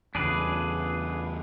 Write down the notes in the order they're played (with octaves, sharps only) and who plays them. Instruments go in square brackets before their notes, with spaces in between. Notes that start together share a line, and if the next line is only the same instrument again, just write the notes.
[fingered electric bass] E2 C#3 [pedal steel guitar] D4 G#4 B4